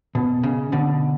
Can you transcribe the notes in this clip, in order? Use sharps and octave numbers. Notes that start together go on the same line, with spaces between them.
B2
C#3
B2 D3